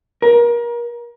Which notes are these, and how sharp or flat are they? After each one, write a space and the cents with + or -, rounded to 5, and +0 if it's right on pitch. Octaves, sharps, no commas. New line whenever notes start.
A#4 +30